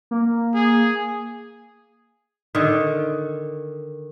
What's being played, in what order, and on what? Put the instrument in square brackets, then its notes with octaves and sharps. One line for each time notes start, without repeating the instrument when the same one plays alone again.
[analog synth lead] A#3
[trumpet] G#4
[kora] D3 D#3